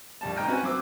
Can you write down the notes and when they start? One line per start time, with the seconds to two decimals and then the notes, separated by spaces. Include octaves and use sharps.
0.21 A#1 G3 A5
0.36 G#2 D#5 G5 A#5 F6
0.48 C4 C#4 F#4 B4 G#5
0.63 F#3 C4 C5 D6 E6